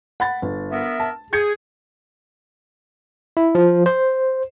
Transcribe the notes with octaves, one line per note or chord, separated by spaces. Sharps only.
F#5 B5 A6
G1
B3 A#4 E5
A5
G#4 G6 G#6 C#7
E4
F3
C5